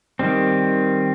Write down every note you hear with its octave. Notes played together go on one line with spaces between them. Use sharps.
D#3 G3 C4